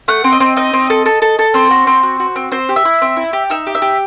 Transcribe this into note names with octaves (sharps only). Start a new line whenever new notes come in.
A3 F#5
C4
D#5
C4
D#4 D#5
C4
A4
A4
A4
A4
C4 C5
F#4
C4
F#4
F#4
C4
C4 C5
G4
E5
E4
C4
E4
G4
D#4 E5
G4
E5
G4